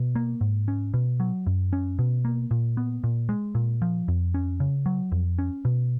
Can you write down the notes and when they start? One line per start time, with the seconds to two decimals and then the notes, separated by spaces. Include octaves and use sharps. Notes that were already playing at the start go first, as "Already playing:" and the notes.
Already playing: B2
0.16 A#3
0.41 G#2
0.68 C#4
0.94 B2
1.20 F#3
1.47 F#2
1.73 C#4
1.99 B2
2.25 A#3
2.51 A#2
2.77 B3
3.04 A#2
3.29 G#3
3.55 A#2
3.82 F3
4.08 F2
4.34 C#4
4.60 C#3
4.86 F#3
5.12 F2
5.39 C#4
5.65 B2